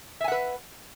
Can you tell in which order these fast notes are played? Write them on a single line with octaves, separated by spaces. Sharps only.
E5 G#5 F#5 B4